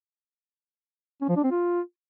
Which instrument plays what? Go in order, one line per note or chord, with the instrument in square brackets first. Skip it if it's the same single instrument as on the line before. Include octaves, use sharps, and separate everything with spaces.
[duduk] C#4
F3
D4
C4
F4